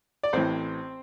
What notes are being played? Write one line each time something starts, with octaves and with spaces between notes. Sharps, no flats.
D5
A1 A2 E3 C4 C5